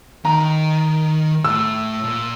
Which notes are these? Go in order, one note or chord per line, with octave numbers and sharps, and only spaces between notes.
D#3 A#5
A2 E6
A#2